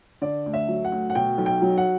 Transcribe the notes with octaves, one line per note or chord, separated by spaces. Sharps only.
D3 D5
D2
E5
F#3
F#5
D2
F#5
B2 G5
B1
G5
F#3
F#5